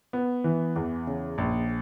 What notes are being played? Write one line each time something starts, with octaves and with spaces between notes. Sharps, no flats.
B3
E3
E2
C#3
A#1